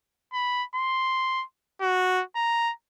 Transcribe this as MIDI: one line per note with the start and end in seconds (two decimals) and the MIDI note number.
0.33 0.64 83
0.75 1.44 84
1.82 2.22 66
2.36 2.71 82